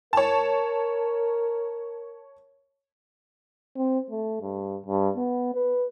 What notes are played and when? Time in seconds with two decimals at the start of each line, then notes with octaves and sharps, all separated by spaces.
0.13 A#4 C#5 A5
3.77 C4
4.11 A3
4.42 G2
4.86 G2
5.16 B3
5.55 B4